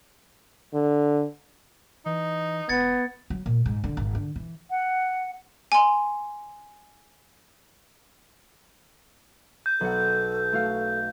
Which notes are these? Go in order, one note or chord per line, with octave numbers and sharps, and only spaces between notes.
D3
E3 D#4
E1 B3 G#6 A6 C#7
F#3
A#2
G#2
D3
G#1
D3
E3
F#5
G#5 C6
G6
B1 A4 F#5
A3 F#4 F5